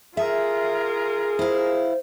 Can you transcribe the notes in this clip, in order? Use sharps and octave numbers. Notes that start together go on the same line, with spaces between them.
F4 G#4 A#4 E5
E4 C5 F5